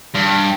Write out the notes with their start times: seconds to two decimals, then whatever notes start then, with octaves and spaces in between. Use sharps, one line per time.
0.15 G2